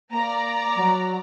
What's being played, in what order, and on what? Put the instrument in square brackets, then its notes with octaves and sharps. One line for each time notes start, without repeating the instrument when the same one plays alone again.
[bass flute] A#3 [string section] D5 A#5
[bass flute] F#3